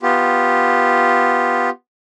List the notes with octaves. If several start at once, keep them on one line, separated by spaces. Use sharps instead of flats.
B3 F4 G4